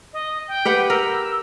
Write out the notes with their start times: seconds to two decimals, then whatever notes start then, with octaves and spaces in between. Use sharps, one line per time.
0.13 D#5
0.48 G5
0.65 G4 B4 F#5
0.90 A#4 E6